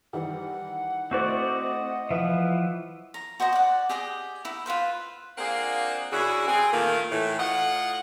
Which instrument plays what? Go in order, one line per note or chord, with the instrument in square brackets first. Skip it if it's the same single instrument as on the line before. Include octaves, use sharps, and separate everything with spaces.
[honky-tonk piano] D#3 E3 G3 [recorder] F#5
[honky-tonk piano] A3 E4 C5 [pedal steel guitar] C4 F#4 D5 [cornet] D#5
[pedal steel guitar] E3 F3 [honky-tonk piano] B4 E5
[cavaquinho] A#5
F#4 C5 D#5 A#5
D5 F#5
G4 G#4 D#5 G5
D#4 E4
F4 F#4 B4 C5
[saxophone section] A#3 C4 D4 F4 G#4 F#5
F#2 C#3 D4 E4 F#4 G#4
C4 G#4
A#2 D#3 E3 A3 A#3
A2 E3
A2 F4 D#5 F#5